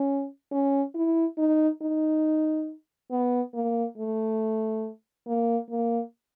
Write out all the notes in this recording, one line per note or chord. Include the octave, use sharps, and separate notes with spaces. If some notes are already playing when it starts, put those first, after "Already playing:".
Already playing: C#4
C#4
E4
D#4
D#4
B3
A#3
A3
A#3
A#3